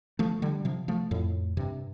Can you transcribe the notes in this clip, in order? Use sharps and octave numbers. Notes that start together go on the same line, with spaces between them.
F3 A3
D3 G3
C3 F3
F3 A3
F2 A2
G2 C3